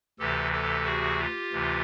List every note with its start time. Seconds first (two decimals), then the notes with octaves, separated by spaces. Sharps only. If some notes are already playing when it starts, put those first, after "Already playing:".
0.19 D2 C3 E3 G4 A4
0.52 G4 A4
0.86 F#4 G#4
1.19 F4 G4
1.52 D2 C3 E3